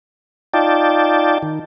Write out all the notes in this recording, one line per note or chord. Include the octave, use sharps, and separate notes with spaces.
D#4 F4 D5 G5 A5
D#3